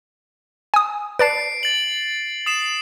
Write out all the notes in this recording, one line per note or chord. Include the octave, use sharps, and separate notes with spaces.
G#5 D#6
B4 D5 A5 C7 D7
A6 F#7
D#6 C7 E7